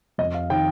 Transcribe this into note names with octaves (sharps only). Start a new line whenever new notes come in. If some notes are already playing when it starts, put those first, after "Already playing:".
F2 D#5
F5
D#3 G5